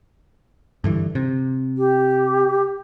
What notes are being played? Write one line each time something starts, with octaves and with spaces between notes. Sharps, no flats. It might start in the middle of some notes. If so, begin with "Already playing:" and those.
G2 D3 E3
C3
G4